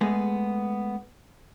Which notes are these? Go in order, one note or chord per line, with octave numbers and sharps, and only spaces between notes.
G#3 A3 B3 G#4